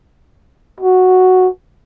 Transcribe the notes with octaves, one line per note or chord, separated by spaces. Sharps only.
F#4